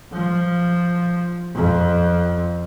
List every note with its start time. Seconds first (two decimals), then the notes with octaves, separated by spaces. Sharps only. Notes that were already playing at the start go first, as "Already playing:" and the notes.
0.13 F3
1.55 F2